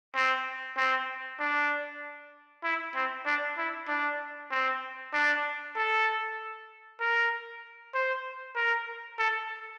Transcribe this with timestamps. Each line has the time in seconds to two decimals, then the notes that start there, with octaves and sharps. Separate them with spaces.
0.15 C4
0.77 C4
1.39 D4
2.64 E4
2.95 C4
3.26 D4
3.58 E4
3.88 D4
4.51 C4
5.13 D4
5.76 A4
7.00 A#4
7.94 C5
8.55 A#4
9.18 A4